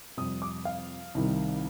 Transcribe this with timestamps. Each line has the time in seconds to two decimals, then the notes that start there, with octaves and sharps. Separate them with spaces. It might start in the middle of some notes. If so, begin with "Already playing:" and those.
0.17 F2 C3 G3 D#6
0.42 D6
0.65 F5
1.15 C2 C3 D#3 G3